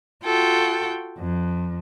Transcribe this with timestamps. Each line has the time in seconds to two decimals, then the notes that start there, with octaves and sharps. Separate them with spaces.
0.25 F4 F#4 A4 G5
1.18 F2